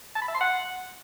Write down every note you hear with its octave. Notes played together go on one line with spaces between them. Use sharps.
A5
B5
E5
C6
F#5